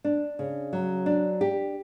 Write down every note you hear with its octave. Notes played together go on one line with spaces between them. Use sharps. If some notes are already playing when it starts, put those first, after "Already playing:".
D4
C#3
F#3
D4
G4